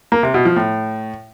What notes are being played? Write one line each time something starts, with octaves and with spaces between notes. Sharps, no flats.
A#3
C3
B2
F3
A2